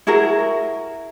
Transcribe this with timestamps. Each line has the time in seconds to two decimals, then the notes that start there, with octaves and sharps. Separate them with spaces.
0.07 E4 F#4 G#4 A#4